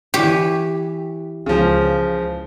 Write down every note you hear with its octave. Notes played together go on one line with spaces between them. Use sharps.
E3 G4 C#5
C#2 C#3 F3